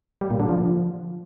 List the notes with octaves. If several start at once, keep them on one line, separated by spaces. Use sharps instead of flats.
G3
A#2
D3
F3